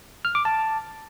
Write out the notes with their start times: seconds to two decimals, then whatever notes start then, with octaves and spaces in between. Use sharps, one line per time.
0.25 F6
0.35 D6
0.45 A5